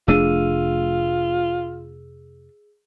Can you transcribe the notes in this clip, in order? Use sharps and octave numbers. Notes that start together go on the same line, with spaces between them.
F1 A3 D4 F4 G#4 E6 D#7